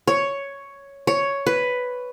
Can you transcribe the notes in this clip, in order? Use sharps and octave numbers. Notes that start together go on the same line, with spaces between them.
C#5
C#5
B4